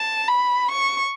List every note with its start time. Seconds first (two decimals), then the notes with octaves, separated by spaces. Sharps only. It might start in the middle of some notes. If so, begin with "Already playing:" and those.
Already playing: A5
0.28 B5
0.72 C#6